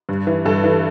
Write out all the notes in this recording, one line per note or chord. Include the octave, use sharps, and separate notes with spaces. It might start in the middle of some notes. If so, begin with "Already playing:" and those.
G2
E3
G2 A4
E3